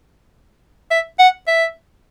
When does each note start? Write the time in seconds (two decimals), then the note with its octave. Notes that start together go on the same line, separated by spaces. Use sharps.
0.90 E5
1.19 F#5
1.47 E5